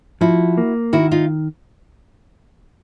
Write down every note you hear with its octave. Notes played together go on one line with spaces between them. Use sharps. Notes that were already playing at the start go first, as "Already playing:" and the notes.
F3 E4 F#4
A#3
D#3 E4 F#4
D#4 F4